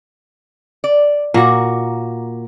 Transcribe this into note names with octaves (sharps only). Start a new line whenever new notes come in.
D5
A#2 A#3 F#4